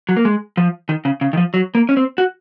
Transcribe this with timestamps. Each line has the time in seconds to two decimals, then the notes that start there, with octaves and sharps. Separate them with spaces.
0.09 F#3
0.17 A#3
0.25 G#3
0.57 F3
0.89 D#3
1.05 C#3
1.21 C#3
1.33 D#3
1.37 F3
1.54 F#3
1.75 A#3
1.89 C#4
1.97 C4
2.18 F#4